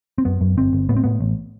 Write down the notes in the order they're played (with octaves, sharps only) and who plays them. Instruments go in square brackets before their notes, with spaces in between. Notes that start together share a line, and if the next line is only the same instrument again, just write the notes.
[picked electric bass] C4
F#2 B3
F#2
G1 C4
G1
A2 B3
C4
A2 B3
A1